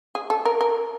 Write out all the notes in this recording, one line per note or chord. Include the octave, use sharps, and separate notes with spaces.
G#4
A4
A#4
A#4